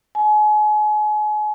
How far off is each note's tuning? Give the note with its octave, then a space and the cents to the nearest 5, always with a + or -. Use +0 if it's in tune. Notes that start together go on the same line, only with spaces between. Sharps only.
G#5 +35